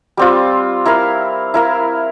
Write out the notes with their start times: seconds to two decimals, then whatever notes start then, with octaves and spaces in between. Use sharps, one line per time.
0.17 G3 C4 F4
0.86 E4 A#4 F5
1.54 E4 A#4 F5